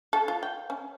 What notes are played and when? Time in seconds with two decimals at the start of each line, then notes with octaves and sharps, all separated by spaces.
0.13 A4
0.28 F4
0.43 G5
0.70 C#4